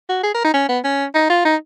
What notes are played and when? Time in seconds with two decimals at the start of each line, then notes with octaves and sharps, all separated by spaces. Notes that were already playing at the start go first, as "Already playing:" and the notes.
0.09 F#4
0.23 G#4
0.34 A#4
0.45 D#4
0.54 C#4
0.69 B3
0.84 C#4
1.15 D#4
1.30 F4
1.45 D#4